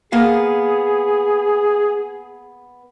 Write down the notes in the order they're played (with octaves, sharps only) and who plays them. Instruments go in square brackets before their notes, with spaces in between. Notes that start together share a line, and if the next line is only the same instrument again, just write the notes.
[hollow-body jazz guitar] A#3 B3 F5 [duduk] G#4